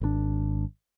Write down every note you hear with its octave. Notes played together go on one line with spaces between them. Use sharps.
G#1 C#3 D4